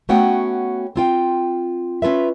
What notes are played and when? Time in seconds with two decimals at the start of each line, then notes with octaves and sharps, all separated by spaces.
0.09 A3 B3 C#4 F#4 F#5 G5
0.96 C4 F4 G5
2.02 C#4 F4 B4 E5